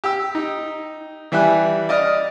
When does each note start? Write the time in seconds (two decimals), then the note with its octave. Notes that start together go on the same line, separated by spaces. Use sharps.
0.04 G4 E6
0.35 D#4
1.32 E3 G3 E5 G#5 F#6
1.89 D5 D#5 D#6 F6